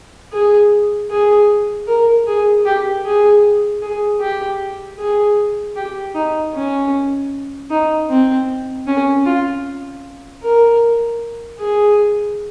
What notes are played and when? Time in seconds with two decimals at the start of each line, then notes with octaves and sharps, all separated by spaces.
0.32 G#4
1.10 G#4
1.87 A#4
2.27 G#4
2.66 G4
3.05 G#4
3.81 G#4
4.20 G4
4.99 G#4
5.76 G4
6.15 D#4
6.54 C#4
7.70 D#4
8.09 C4
8.87 C#4
9.26 F4
10.42 A#4
11.59 G#4